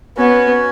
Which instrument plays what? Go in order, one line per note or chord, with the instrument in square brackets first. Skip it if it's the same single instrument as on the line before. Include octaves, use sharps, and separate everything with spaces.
[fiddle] B3 [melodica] C#4 F#4 C#5